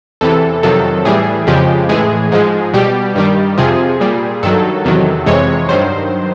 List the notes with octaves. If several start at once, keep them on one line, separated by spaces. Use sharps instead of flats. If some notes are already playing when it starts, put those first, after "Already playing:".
E2 C3 E3 A4
F2 C3 D#3 F#3 A4
A2 E3 G3 G#4
F2 C#3 F3 G#3 G4
A2 E3 G#3 G#4
G#2 F3 G#3
B2 G3 G4
G2 D#3 G3
F2 C3 F3 G#4
A#2 G3
G2 D#3 F#3 A4
E2 C3 D#3 F#3
F2 C3 E3 G#3 C#5
G2 D#3 F#3 C5